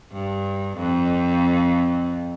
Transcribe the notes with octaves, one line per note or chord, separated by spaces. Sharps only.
G2
F2